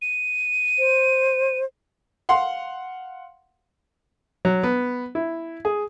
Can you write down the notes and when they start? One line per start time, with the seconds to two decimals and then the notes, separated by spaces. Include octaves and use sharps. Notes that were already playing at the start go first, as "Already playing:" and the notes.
0.02 D#7
0.79 C5
2.29 F5 F#5 C6
4.45 F#3
4.63 B3
5.15 E4
5.65 G#4